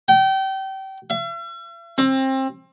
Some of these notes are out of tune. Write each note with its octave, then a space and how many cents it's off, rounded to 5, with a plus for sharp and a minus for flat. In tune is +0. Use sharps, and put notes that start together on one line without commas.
G5 -30
E5 +45
C4 +25